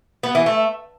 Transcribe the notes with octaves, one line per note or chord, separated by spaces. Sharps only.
B3
E3
A3